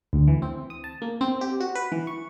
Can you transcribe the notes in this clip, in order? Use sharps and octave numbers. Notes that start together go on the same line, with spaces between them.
D2
E3
C4
D#6
A5
A#3
C4
G4
F#4
B4
E3
C#6